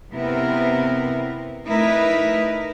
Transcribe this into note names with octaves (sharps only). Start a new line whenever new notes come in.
C3 B3 C4 E4 A#4
A3 D#4 E4 A#4 B4